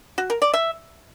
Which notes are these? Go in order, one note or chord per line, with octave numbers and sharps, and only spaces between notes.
F#4
A#4
D5
E5